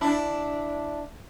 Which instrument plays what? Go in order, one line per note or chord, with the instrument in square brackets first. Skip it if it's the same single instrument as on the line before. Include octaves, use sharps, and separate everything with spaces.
[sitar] D4 E4